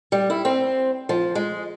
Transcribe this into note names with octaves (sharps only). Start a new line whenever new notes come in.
G3
E4
C4
F3
G#3